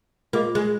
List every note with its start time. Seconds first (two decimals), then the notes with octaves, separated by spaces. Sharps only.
0.33 A#3 F4 G#4 D#5
0.55 G#3